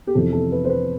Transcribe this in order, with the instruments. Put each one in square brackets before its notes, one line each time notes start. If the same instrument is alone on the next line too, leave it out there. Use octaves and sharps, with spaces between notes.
[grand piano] G4
F2 C3 E3 A4
A4
B4
C5
B4